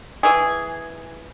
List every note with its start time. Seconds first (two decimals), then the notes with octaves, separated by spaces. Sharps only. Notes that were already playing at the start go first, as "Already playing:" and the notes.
0.23 E3 G#4